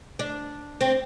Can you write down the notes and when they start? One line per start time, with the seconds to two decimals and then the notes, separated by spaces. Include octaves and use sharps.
0.19 D4
0.81 C4